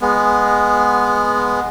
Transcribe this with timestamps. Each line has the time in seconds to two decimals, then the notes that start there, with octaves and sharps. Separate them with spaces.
0.01 G#3 B3